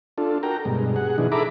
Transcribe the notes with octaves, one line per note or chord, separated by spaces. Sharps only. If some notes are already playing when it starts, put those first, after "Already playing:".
D4 F4 A4
F#4 A#4 G5 A#5
G2 B2 G#3
G#4 F#5
B2 E3 F3 D4 D#4 G#4
G#4 A4 E5 A#5 B5 D6